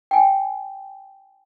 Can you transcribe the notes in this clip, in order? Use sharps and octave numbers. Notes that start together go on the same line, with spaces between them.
G5 G#5